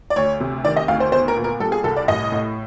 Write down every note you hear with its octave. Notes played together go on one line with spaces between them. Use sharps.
D5
D2 C#5
C3
D#3 D5
D#5
D2 F5
C5
B3 C5
A#4
A#2
A#4
G3 A4
G#4
C2 A4
D5
A1 D#5
A2